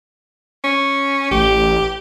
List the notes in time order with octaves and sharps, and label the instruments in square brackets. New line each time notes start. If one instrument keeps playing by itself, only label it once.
[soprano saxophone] C#4
[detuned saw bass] A1 [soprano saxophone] G4